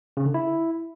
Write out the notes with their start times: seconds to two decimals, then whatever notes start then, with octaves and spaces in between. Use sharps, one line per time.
0.17 C#3
0.26 D3
0.34 E4